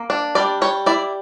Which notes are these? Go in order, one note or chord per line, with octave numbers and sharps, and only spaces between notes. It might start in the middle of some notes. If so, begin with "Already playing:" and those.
Already playing: A#3
D4
G3 D5
G3 C#5
E4 D5